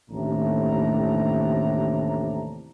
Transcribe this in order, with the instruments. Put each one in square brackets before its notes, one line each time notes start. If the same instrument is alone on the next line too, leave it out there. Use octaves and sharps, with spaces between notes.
[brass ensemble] A1 D#2 A2 C3 D4 A#5